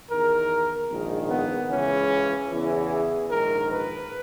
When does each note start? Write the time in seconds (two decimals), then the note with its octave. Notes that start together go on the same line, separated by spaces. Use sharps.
0.10 E2 D#3 A#4
0.90 A#1 G#2 D#3
1.30 B3
1.70 C#2 C#3 E3 C#4
2.50 E2 C#3 E3
2.90 G#4
3.29 A#1 G#2 D#3 A#4
3.70 B4